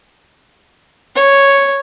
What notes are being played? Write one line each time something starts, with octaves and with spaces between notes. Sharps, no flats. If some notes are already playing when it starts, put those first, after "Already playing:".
C#5